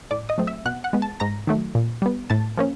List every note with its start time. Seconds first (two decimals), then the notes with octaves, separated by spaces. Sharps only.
0.11 A2 D5 D6
0.29 D#5 D#6
0.38 F#3 A3 C4
0.47 E5 E6
0.65 B2 F#5 F#6
0.84 F#5 F#6
0.93 G#3 B3
1.02 A5 A6
1.20 G#2 A#5 A#6
1.47 D#3 F#3 A3
1.75 A#2
2.02 G3 B3
2.30 A2 A5 A6
2.57 F3 A#3 C#4